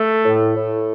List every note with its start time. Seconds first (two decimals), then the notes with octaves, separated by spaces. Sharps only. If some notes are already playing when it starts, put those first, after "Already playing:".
Already playing: A3
0.25 A2
0.57 A2